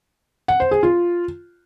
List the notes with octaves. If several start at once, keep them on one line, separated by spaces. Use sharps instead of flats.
F#5
C5
G#4
F4